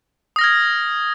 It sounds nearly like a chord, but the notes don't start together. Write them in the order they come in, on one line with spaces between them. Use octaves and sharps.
D#6 A#6 F6 G#6